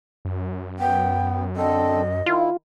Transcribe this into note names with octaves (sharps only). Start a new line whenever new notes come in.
F#2
B3 G5
D3 C4 A4 D#5
D#3 E4 F4